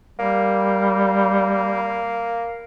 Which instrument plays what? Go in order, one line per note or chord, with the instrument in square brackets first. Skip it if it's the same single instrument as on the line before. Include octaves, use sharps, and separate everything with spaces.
[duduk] G3 [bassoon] A#3